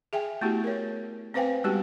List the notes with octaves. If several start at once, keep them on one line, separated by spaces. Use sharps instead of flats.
G#4 E5 G5 G#5
A3 B3 E4 F#4 G4
A#4 C#5
C4 B4 C5 F5 G5 G#5
G3 G#3 B3 D#4 F#4 G4